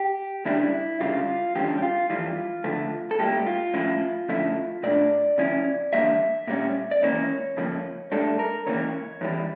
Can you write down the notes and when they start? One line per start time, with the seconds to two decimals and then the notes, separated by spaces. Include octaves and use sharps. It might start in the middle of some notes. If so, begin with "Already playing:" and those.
Already playing: G4
0.45 D2 C#3 G3 D4 E4
1.00 D2 C#3 G3 F4
1.55 E2 D3 G3 C#4 G4
1.78 G4
1.82 F4
2.10 F2 E3 G3 F4
2.64 D2 D3 F3 A3
3.11 A4
3.19 A2 G3 A#3 G4
3.46 F4
3.74 A2 F3 C#4 E4
4.29 F2 D3 A3 C#4 E4
4.83 A#2 A3 D4 D5
5.38 C#3 F3 C#4 E4
5.93 E2 D3 G3 A#3 E5
6.47 A#2 G3 C#4
6.91 D5
7.02 C#2 C#3 E3 A#3 C#4 C#5
7.57 F2 C#3 F3 A#3 C#4
8.12 A2 G3 D4 A4
8.39 A#4
8.66 C#2 C#3 E3 A#3 C#5
9.21 E2 E3 G3